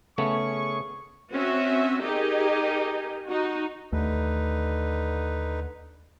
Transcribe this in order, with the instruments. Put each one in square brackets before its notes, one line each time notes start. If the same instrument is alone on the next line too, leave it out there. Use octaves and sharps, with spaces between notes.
[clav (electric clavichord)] C#3 A3 B3 [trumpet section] C#4 G#4 C#6
[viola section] C4 C#4 F#4 E5
D#4 G4 G#4 A#4 D#5
D#4 F#4
[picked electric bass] D#2 A3 [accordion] D3 D#4 B4